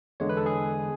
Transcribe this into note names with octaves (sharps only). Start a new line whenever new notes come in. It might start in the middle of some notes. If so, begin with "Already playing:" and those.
E2 D3 G#3 C#5
B4
A4
G#4